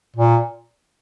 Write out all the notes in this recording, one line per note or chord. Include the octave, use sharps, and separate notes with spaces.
A#2